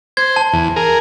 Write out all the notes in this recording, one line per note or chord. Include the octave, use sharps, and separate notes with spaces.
C5 G#6
A5
E2
G#4 A#4